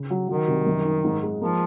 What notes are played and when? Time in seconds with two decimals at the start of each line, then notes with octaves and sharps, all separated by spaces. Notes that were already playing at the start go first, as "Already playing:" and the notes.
Already playing: C#3
0.10 F#3
0.28 D#3 F#3
0.48 C2
0.66 F#2
0.85 D#4
1.04 G#2
1.23 G#3
1.41 F3 A#3